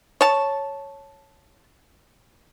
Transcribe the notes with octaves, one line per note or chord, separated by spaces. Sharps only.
C#5 A5